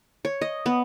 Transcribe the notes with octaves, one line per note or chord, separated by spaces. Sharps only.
C#5
D#5
B3